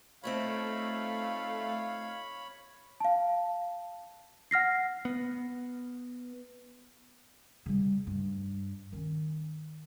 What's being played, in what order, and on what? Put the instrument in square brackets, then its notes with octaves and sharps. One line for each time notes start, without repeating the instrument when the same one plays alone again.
[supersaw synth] A3 [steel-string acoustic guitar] C4 D#4 F4 [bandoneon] C#5 B5 [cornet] F5
[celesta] F5 A5
F#5 F6 A#6 C7
[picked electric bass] B3
[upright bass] C#3 G3
G2
D#3 C#4